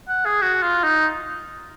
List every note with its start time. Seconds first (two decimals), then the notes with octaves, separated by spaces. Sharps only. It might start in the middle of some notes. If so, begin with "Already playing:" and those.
0.09 F#5
0.25 G#4
0.41 F#4
0.62 F4
0.84 D#4